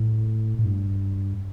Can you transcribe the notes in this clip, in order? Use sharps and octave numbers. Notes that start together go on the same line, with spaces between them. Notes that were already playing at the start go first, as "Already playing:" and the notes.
Already playing: A2
A2
G2